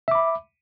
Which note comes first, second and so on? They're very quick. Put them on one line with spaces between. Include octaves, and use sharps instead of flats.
E5 D6 B5